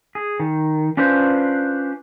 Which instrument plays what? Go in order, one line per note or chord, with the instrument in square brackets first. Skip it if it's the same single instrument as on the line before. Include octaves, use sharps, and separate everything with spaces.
[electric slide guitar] G#4
D#3
C#4 D4 F4 B4 C5